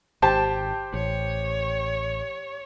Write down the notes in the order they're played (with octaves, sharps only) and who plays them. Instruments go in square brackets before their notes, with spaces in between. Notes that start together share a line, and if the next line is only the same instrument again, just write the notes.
[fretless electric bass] G#1 [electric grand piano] G4 C5 G5 [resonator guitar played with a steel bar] A5
[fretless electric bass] A1 [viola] C#5